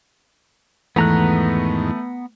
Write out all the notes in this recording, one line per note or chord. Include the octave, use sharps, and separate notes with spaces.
E2 G#2 D#3 E3 A3 B3 A#5 F#6